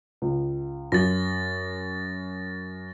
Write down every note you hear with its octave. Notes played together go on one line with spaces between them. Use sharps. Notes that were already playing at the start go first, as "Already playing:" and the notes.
C#2
F#2 A6 A#6